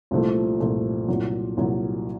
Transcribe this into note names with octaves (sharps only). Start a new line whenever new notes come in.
C2 A#2 F3 A3
C2 A#2 F3 A3
C2 A#2 F#3
C2 A#2 F#3